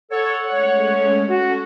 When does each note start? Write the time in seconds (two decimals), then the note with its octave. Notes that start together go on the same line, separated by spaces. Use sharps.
0.11 A4 C#5 F#5
0.50 G#3 A3 C#4 C#5
1.28 C#4 F#4 A4